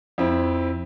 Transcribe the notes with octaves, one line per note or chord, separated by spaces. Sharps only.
F2 C4 E4